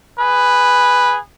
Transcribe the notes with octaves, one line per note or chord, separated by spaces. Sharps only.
G#4 B4